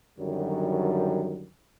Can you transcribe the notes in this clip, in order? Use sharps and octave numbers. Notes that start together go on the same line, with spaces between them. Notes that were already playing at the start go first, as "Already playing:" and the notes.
F#2 D3 D#3 F#3 G3